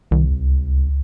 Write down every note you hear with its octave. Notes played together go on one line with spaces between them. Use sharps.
C2 D#3
C#2